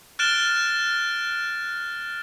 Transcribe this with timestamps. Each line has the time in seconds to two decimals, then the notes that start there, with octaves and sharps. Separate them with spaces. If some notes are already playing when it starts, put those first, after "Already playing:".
0.19 F6 F#6 A6 D7 E7 G7